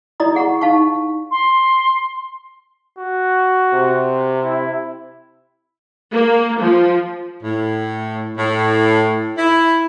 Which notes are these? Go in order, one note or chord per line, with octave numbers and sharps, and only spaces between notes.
E4 D5 D#5 A#5 D#6
G#4 F#5 A#5 C#6
D#4 F5 A5 C#6
C6
F#4
C3
E4
A#3
F3
A2
A2
E4